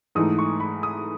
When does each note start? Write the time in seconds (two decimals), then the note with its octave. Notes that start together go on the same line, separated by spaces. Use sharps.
0.15 G#2 E3 A3 D#4 D#6
0.38 C#6
0.60 B5
0.83 D#6